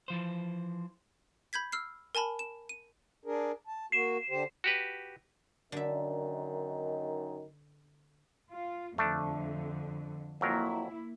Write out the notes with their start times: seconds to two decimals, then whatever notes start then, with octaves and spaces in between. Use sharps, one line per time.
0.08 E3 F3 C5
1.53 B5 G6 G#6 B6
1.72 E6 F6 C7
2.15 A#4 G#5 A5 B5
2.39 E7
2.69 D#7
3.25 D4 G#4 A#4
3.67 A5
3.92 A#3 F#4 C7 E7
4.30 D3 G4 C5
4.64 F#4 G4 B4
5.72 F#2 D3 D#3 D#4 E5
8.52 F4
8.98 F2 D3 A3 D4
10.41 F2 F#3 A#3 E4 A#4